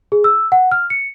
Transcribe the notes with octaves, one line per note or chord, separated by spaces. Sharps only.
G#4
E6
F#5
F6
C#7